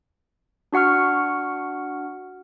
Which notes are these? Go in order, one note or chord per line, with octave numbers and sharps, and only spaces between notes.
D4 F#4 F#5 C#6 F6